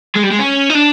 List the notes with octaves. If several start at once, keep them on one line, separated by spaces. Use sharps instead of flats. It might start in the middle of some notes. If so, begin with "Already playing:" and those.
G#3
G3
G#3
C#4
D#4
D4